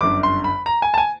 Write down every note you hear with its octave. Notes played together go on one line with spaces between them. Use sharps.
G1 F#2 D3 D6
C6
B5
A#5
G#5
A5
G#5